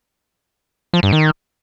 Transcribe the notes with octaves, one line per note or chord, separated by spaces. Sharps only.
F3
G2
D#3